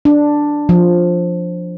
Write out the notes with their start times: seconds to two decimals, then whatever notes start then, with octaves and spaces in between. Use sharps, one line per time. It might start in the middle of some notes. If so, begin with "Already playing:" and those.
0.05 D4
0.69 F3